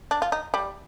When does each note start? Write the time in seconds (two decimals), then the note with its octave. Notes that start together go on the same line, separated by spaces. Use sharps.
0.11 D4
0.22 F4
0.32 D#4
0.54 G3